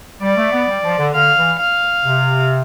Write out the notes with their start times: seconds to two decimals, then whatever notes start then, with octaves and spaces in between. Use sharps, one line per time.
0.21 G3 D5
0.37 A3
0.52 B3
0.68 G3
0.83 F3
0.99 D3
1.13 D3 F5
1.37 E3
1.59 F5
2.05 C3